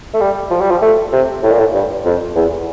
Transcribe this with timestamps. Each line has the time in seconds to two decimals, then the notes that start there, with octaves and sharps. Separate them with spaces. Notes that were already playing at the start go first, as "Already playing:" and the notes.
0.14 A3
0.21 G3
0.51 F3
0.61 G3
0.71 F3
0.82 A3
1.13 C3
1.43 A2
1.51 A#2
1.59 A2
1.74 G2
2.05 F2
2.36 E2